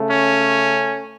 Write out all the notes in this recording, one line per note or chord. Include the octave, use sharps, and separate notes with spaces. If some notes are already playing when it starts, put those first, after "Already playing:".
Already playing: C#3 A3
C#4